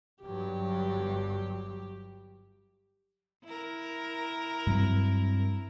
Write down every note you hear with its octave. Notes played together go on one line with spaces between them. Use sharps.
G1 G2 F#3 G4
E4 A#4
G2 F#3 C4